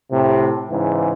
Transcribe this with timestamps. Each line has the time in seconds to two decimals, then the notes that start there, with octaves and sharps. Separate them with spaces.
0.11 A2 C3
0.70 G#2 C#3 E3